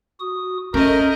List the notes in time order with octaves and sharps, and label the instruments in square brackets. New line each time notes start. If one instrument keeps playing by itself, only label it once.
[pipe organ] F#4 D#6
[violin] A3 D#5 [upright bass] C#4 [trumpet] A#4 [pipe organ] G6